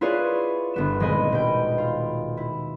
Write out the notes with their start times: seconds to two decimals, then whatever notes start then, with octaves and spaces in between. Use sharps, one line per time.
0.01 E4 F4 G#4 B4 C#5 D5
0.74 G1 B3 E7
1.00 D#1 G#3 C4 D#5 G#5 B5
1.32 B2 G5
1.78 F4
2.37 E4